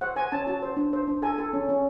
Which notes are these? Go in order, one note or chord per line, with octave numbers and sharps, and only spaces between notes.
C5 F#5
C5 G#5
C#4 A5
F#4 A5
C5
D4
C5
D4
A4 G#5
A4
C#4
C#4